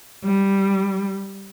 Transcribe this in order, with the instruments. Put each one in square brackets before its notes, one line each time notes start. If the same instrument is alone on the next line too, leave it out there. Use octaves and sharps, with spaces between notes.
[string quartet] G3